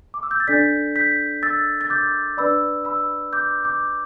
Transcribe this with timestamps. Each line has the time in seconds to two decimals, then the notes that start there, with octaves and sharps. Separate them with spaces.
0.14 D6
0.23 E6
0.31 G6
0.40 A6
0.48 D4 A4 D5 G6 B6
0.96 G6 B6
1.43 E6 A6
1.81 A6
1.90 D6 G6
2.37 D4 B4 D5 B5 E6
2.85 B5 E6
3.33 D6 G6
3.64 D6 G6